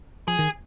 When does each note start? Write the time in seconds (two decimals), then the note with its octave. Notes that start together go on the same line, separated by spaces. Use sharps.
0.27 F3 G#4
0.39 D#3